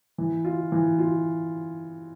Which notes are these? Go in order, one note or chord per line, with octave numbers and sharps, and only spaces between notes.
E3
F4
E3
F4